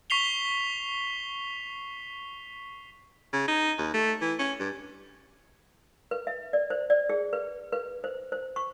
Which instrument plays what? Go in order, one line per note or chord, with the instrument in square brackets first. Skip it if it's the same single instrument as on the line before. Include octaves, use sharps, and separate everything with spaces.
[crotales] C#6 B6 C7 F7 G7
[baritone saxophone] C#3
D#4
D#2
A3
E3
C#4
G2
[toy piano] B4
E5
D5
C5
D5
G#4
B4
B4
C5
C5
C#6